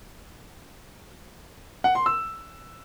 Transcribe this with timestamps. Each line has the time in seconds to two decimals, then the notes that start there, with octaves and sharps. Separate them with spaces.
1.84 F#5
1.95 C6
2.06 E6